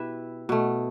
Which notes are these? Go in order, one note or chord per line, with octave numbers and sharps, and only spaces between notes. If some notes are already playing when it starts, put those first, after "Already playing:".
Already playing: B2 E4 G4 B4 E5
B2 A3